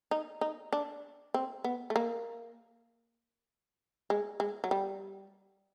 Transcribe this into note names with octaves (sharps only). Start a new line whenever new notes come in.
D#4
D#4
D4
C4
B3
A3
A#3
G#3
G#3
F#3
G3